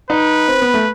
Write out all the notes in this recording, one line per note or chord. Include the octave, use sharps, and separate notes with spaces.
D#4 B4
C4
B3
A3